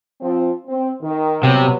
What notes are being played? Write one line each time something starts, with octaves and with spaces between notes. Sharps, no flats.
F3 C4
C4
D#3
C3 F#3 G3 B3